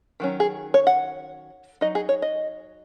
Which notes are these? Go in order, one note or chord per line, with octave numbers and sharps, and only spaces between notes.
D#3 F#3 C#4
G#4
C#5
F#5
F#3 D#4 D#5
G#4
C#5
D#5